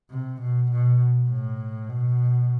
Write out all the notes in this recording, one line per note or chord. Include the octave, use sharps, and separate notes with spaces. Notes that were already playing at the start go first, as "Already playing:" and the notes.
C3
B2
B2
A2
B2